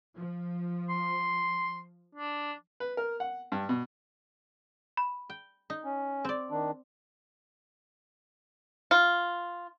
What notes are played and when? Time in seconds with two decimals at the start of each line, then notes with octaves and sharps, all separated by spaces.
0.16 F3
0.90 C6
2.15 D4
2.80 B4
2.97 A#4
3.20 F#5
3.52 G2
3.69 B2
4.97 B5
5.30 G5
5.70 D#4
5.84 C#4
6.25 C4 D5
6.51 D#3 D4
8.91 F4